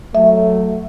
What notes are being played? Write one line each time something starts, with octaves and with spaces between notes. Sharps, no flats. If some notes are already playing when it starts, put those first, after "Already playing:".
F#3 A3 E5